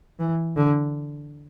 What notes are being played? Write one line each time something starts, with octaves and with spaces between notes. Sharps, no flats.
E3
D3